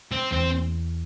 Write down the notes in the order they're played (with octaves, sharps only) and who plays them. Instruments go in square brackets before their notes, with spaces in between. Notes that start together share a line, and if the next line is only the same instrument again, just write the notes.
[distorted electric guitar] C4
[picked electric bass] E2 [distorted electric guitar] C4